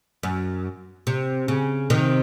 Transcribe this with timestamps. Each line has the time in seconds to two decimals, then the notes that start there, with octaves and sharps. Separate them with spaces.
0.23 F#2
1.07 C3
1.48 C#3
1.90 C3 D#3